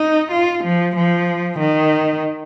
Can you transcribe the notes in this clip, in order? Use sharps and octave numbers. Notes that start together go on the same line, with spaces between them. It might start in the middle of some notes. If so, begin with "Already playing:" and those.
Already playing: D#4
F4
F3
F3
D#3